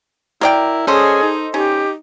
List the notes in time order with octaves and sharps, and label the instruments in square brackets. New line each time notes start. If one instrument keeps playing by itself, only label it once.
[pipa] F#3 D5 G5 [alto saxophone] E4 [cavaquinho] A#4
[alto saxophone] C#4 [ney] G#4 [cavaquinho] A4 C5 D#5
[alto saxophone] D#4
[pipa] C#4 [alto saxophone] D#4 [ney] G4